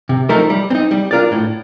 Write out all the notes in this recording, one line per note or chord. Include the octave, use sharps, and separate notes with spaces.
C3
F3 A3 D#4 A#4
G3
C4
D#4
G3
D4 F4 A#4 D5
A2